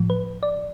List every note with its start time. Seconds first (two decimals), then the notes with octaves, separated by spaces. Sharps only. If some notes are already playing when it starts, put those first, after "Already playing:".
Already playing: A2 F3
0.10 B4
0.43 D5